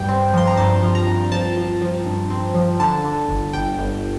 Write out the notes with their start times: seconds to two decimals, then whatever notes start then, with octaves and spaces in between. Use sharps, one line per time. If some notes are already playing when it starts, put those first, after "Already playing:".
Already playing: G2 G5
0.09 C4
0.33 F3 C6
0.47 A#5
0.57 G2 A5
0.83 F3
0.95 A#5
1.07 G2
1.32 F3 A5
1.57 F3
1.81 F3
2.06 G2
2.30 C4
2.54 F3
2.80 D3 A5
3.04 D3
3.28 G1
3.53 G1 G5
3.78 G1